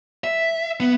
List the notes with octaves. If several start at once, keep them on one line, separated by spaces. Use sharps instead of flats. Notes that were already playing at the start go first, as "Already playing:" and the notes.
E5
B3